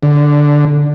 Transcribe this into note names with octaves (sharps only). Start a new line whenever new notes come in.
D3